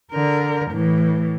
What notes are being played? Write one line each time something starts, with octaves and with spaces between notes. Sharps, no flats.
D3 A#4
A2 E3